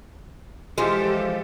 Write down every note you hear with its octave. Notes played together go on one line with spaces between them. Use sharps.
E3 F3 G#3 G4 A4